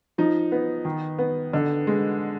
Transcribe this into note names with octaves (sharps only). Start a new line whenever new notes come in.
F3 D#4
B3
D#3
B3
D3
G#3